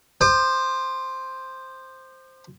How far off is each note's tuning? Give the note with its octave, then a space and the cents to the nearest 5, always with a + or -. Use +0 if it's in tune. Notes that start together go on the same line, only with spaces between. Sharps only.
C5 +0 D6 +45